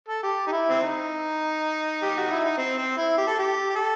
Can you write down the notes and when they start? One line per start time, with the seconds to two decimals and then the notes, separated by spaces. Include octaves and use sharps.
0.09 A4
0.23 G4
0.47 D#4
0.52 E4
0.70 C4
0.82 D#4
2.03 G4
2.17 F#4
2.31 E4
2.45 D#4
2.58 C4
2.78 C4
2.97 E4
3.18 G4
3.28 A4
3.38 G4
3.70 G4
3.76 A4